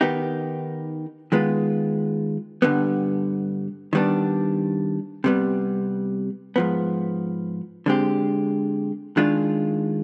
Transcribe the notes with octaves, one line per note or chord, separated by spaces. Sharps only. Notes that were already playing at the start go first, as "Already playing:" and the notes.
D#3 B3 D#4 G4
D#3 G#3 B3 F4
G2 D3 G3 B3
D#3 G3 B3 D4
C3 G3 B3
G#2 F3 B3
D3 G#3 C4 G4
D#3 G#3 D4 F4